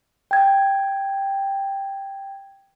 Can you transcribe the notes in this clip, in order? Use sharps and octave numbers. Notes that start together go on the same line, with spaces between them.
G5 G#6